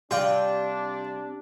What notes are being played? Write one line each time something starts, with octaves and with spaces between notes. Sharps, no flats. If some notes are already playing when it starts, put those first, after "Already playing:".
C3 G3 D4 F4 D5 G5